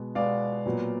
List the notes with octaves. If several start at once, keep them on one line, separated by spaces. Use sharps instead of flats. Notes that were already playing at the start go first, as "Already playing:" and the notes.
Already playing: B2 G#3 B3
B2 G#3 B3 D5 F5
A#2 F#3 B3